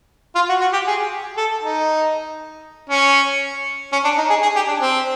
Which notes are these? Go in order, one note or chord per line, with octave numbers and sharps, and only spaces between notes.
F4
F#4
F#4
G4
G#4
A4
D#4
C#4
C#4
D4
D#4
G#4
G#4
G4
D4
C4